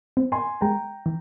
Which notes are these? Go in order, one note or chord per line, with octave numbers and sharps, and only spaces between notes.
C4
G#5 C6
G#3 G5 A#5
E3